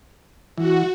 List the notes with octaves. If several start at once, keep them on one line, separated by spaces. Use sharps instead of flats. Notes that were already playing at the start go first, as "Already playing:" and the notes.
E3 F#4